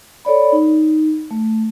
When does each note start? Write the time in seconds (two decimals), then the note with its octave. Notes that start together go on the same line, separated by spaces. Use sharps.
0.25 A4 C#5 D5 B5
0.52 D#4
1.31 A3